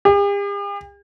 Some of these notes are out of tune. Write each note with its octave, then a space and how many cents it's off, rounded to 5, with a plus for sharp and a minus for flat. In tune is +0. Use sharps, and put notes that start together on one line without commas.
G4 +45